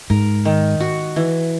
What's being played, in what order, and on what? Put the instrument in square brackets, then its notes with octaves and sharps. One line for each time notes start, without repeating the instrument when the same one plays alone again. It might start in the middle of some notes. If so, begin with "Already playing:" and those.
[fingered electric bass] G#2 [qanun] A#4
[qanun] D#3
F#4
E3